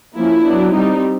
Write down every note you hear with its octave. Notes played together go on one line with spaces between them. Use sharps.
F3 A#3 C#4 E4
F#3 B3 D4
G3 C4 D#4